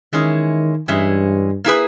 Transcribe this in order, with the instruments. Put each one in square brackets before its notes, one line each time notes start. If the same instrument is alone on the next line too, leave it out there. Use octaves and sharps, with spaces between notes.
[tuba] D#3 [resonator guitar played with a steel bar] E3 G#3 C#4 E4
[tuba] G2 [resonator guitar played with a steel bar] E3 G#3 C#4 E4
[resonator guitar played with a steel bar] A#3 E4 G#4 B4